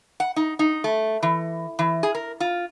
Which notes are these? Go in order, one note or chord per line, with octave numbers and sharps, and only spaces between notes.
F#5
D#4
D#4
A3
E3
E3
G#4
A#4
F4